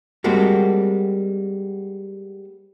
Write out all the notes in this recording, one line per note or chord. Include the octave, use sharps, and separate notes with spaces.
G3 G#3 A#3 C4 F#4 A4